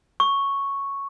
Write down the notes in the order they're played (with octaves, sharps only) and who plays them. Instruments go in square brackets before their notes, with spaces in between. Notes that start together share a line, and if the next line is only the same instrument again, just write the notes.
[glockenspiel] C#6